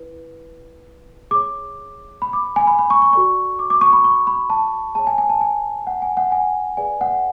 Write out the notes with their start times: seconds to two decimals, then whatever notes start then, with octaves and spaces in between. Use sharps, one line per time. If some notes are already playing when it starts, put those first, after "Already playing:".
Already playing: E4 B4
1.31 G#4 C#5 D6
2.22 B5
2.33 D6
2.56 G#5
2.67 B5
2.79 B5
2.90 C#6
3.02 C#6
3.13 F#4 A4 D5 C#6
3.59 D6
3.70 D6
3.81 C#6
3.93 B5
4.04 C#6
4.27 B5
4.50 A5
4.95 G#4 C#5 A5
5.07 G#5
5.18 G#5
5.30 A5
5.41 G#5
5.87 F#5
6.02 G#5
6.17 F#5
6.32 G#5
6.77 G#4 B4 D5 G#5
7.01 F#5